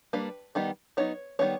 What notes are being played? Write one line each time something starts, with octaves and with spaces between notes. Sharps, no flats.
G3 A#3 D4 B4
D#3 G3 B3 D#4
F#3 B3 D#4 C#5
D#3 G3 B3 D4 C#5